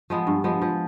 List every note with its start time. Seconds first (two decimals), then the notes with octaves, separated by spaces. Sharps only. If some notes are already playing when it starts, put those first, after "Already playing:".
0.10 F3 G#3 B3
0.27 G2
0.44 F3 G#3 B3
0.62 F3